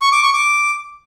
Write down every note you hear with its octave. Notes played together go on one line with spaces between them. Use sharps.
C#6
D6
C#6
D6